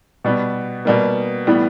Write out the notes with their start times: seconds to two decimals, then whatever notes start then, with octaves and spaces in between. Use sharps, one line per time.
0.24 B2 G3 B3
0.85 B2 G3 A#3
1.47 A2 E3 G3 B3